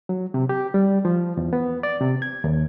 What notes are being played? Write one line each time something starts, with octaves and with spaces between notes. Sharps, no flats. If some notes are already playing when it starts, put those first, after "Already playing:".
F#3
C3
G4
G3
F3
E2
B3
D5
C3
G#6
D#2